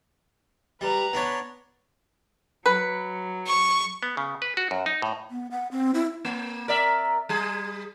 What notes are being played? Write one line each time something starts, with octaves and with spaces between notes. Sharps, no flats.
G3 B4 A#5
B3 D4 C#5
F#3 B4
C#6
B3
C#3
B4
F#4
F#2
D#4
A2
B3
F#5
C4
E4
A#3
A#4 D5 E5
G3 G#4